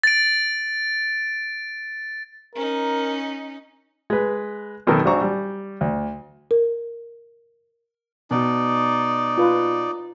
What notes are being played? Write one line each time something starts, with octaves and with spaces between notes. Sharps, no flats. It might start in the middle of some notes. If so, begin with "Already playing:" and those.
A6 D7
C#4 D#4 A#4
G#3 B4
F#2 B2 D#3 A4 A#4
G#1 D4 F#4 C5 A#5 C#6
G3
D2
A#4
B2 D#4 D5
F4 B4